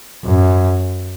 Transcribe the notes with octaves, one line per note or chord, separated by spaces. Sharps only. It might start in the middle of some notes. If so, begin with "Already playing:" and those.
F#2